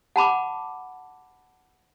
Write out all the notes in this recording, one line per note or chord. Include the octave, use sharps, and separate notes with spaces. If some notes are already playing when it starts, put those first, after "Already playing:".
F#5 A5 B5 D6